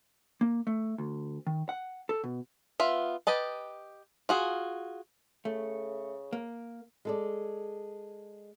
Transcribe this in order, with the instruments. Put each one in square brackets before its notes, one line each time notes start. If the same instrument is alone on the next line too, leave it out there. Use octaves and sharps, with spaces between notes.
[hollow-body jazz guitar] A#3
A3
D2
D#3
F#5
A4
B2
[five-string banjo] B3 F4 E5
G4 B4 D#5 A5
F4 F#4 G#4
[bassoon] C#3 [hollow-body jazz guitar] A3
[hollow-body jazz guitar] A#3
[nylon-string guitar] G#3 A4 D5